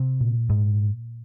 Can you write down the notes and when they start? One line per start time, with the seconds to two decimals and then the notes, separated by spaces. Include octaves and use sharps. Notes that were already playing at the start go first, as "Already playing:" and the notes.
Already playing: C3 C4
0.20 A#2
0.49 G#2 G#3